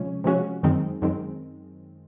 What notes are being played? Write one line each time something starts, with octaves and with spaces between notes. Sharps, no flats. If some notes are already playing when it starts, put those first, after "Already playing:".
Already playing: C3 F3 G#3 C#4
C3 F3 G#3 C#4 F#4
F#2 D#3 G#3 C4
F#2 D#3 G#3 C4